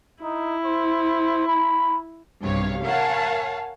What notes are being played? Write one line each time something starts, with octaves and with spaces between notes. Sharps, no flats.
D#4 E4
C5
B5
B1 G2 C3 C#5 F5
A#4 C#5 F5 F#5 G#5 A5